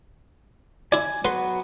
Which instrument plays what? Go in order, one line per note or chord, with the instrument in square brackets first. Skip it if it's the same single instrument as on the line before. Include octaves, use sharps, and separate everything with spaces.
[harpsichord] E4 D5 [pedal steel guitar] G#5
[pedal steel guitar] F#3 B3 F#4 [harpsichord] B4 C6